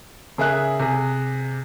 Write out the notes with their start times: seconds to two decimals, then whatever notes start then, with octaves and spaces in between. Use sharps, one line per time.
0.38 C#3 G#4 A#4 E5 F#6
0.79 C3 G#4